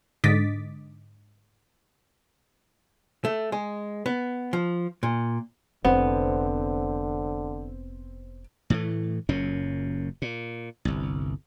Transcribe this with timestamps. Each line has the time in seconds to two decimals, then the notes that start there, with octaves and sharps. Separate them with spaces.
0.24 G#2 D3 D#5 D6 A6 B6
3.25 A3
3.52 G#3
4.06 B3
4.53 F3
5.03 A#2
5.85 F1 D3 B3 C4
8.70 A2 E3 A3
9.29 F#1 F#2 A#2 C#4
10.22 A#2
10.85 G1 C2